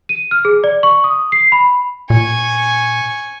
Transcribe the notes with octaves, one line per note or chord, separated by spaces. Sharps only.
D#7
F6
G#4
D5
C#6
D#6
C7
B5
A#2 G#5 C#6